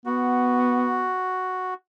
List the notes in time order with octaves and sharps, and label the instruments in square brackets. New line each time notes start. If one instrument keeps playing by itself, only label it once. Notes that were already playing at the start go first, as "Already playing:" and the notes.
[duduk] B3 [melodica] F#4